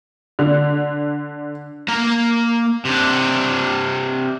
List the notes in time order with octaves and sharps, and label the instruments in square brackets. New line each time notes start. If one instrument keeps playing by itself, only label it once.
[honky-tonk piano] D3
[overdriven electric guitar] A#3 A#5
C3 D4